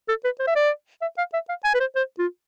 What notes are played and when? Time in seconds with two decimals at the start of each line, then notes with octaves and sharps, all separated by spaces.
0.08 A4
0.24 B4
0.39 C5
0.47 E5
0.56 D5
1.02 E5
1.18 F5
1.33 E5
1.49 F5
1.64 G#5
1.74 B4
1.80 C5
1.95 C5
2.19 F4